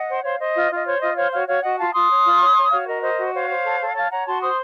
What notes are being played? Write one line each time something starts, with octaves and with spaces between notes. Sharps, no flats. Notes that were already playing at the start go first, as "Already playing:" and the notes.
Already playing: D#5 F#5
C5
C5 C#5 F5
C5 D#5
F4
F4
D#5
C5 C#5
F4 D#5
C5 C#5 F5
F#4 C#5 F5
F#4 C#5 F5
F#4 D#5 F#5
F4 F5 A5
F4 C6 D#6
C#5
F4
C#5
C#5
F#4 C#5 F5
A#4 D#5
C5 D#5
F#4
C5 C#5 F5
C5
A4
A4
C#5 F5 A5
C#5 F#5 A#5
F#4 A5 C6
C5 C6 D#6